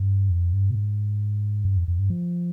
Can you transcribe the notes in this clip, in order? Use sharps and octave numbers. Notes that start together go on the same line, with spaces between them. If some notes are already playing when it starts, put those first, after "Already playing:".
Already playing: G2
F2
G2
B2
G#2
G2
F2
F2
G2
F3